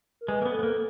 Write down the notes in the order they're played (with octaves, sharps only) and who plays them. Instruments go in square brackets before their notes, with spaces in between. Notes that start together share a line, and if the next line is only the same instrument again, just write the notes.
[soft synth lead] A#4
[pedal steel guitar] G#3 [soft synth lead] B4
[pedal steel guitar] A#3
B3
[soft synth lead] A4
[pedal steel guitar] B3
A#3
[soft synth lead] A4